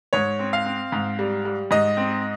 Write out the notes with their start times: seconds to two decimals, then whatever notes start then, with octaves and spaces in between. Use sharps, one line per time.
0.13 G#2 C#5
0.39 C4
0.53 F5
0.66 C4
0.92 G#2
1.19 G3
1.45 G3
1.71 G#2 D#5
1.97 C4